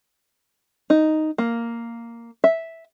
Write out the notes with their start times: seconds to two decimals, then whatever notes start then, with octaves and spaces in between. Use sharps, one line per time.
0.90 D#4
1.38 A#3
2.44 E5